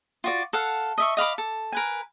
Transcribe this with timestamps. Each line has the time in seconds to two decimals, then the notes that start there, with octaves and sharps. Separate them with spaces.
0.24 F4 F#4 D5
0.53 A4 F5 F#5
0.98 D#5 E5 C#6
1.17 D#5 F5 B5 D6
1.38 A4
1.72 A#4 B4 G#5